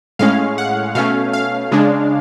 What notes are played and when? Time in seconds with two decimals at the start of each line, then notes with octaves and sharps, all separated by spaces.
0.19 A2 G#3 C#4 F5
0.58 F#5
0.95 B2 A3 C#4 F5
1.33 F5
1.72 C#3 G#3 D4